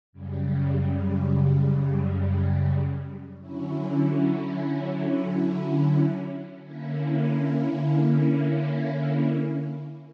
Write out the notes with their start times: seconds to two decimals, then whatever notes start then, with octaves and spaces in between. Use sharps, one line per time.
0.12 F#2 C#3 G3
3.39 D3 F#3 C#4 E4
6.65 D3 A#3 C#4 E4